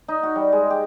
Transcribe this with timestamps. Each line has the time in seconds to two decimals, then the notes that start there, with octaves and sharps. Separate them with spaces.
0.08 D#4
0.23 F#4
0.36 G3
0.52 G#3
0.70 G4